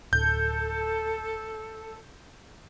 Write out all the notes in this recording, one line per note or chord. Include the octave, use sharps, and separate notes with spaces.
D1 A4 G6